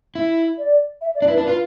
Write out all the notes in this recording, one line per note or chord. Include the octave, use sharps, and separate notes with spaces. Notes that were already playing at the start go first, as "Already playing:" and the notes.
E4
D5
E5
D5
D4
E4 B4
D4
B4
F4